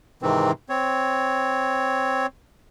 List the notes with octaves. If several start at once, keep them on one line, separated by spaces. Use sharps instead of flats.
G#2 C3 D#3 E3 C4
C4 C#5